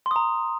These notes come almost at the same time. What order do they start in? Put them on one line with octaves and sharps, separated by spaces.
C6 D#6 A#5